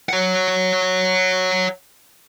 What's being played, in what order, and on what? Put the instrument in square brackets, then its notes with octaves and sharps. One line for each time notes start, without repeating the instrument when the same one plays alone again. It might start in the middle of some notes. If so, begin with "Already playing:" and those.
[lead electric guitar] C#5 F#5